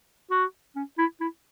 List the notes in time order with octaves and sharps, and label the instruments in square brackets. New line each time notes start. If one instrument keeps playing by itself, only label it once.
[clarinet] F#4
C#4
E4
E4